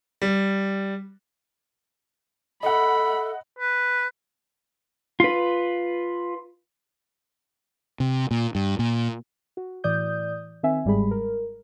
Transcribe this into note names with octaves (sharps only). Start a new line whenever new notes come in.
G3
A4 D#5 E5 F#5 B5
B4
F4 B4
C3
A#2
G2
A#2
F#4
A2 E3 D5 D#6 G6
D#3 C4 E5 G#5
G1 G#2 G3 G#3 G#4 B5
A#4